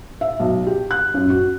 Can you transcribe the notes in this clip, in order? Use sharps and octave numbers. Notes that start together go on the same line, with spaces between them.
E5
B1
G4
F#6
F#2
F#4